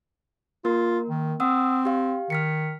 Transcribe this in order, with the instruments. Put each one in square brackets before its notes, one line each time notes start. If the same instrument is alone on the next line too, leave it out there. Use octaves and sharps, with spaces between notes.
[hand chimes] A#3 A#4 [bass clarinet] F4
[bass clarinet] D#3
[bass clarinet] C4 [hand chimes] F#5 D#6 E6
[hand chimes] G4 F5
[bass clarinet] D#3 [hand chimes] F6 B6 C#7